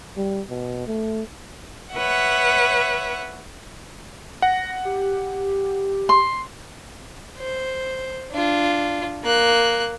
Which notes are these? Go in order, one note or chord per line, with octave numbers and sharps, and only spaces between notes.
G3
B2
A3
B4 C#5 E5 F#5
F#5 A#6
G4
C6
C5
D4 F4
A#3 F#6